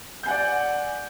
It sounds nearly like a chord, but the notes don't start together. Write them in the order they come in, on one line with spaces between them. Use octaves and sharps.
G6 G#5 F#5 D5